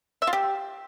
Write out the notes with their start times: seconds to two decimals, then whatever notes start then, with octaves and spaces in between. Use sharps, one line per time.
0.22 E5
0.27 F4
0.33 G4